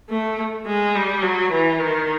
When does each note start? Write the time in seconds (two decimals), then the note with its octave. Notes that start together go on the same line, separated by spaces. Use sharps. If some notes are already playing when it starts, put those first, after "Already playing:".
0.10 A3
0.67 G#3
0.95 G3
1.23 F#3
1.52 E3
1.80 D#3